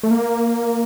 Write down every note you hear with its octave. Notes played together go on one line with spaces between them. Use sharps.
A3
A#3